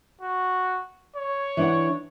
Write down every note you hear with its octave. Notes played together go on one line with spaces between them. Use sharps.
F#4
C#5
E3 D4 F#5